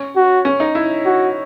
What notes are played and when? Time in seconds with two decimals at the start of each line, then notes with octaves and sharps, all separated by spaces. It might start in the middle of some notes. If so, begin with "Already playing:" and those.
Already playing: C#4
0.16 F#4
0.45 C#4
0.60 D#4
0.75 E4
1.05 F#4